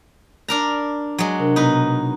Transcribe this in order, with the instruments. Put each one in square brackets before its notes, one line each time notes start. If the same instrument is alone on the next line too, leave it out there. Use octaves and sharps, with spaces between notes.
[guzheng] D4 A#4 A#5
F#3 G#3
[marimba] C3 D4 A#4
[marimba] B2 B3 [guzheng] D#4 B4